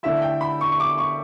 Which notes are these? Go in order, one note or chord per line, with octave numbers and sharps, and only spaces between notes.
D3 A3 E4 E5
G5
B5
C#6
C#6
D6
C#6